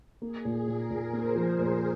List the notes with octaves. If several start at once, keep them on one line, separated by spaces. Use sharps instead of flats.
A#3 G#4
A#2
A#2 A#4
A#2
A#3 C5
F3
A#4
A#2